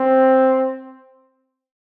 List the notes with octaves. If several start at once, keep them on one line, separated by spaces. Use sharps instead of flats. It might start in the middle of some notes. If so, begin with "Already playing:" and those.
Already playing: C4